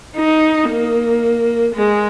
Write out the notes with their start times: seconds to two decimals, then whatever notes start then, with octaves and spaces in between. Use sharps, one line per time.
0.16 D#4
0.70 A#3
1.74 G#3